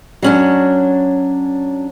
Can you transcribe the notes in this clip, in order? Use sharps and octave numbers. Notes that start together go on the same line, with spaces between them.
F#3 C#4 D4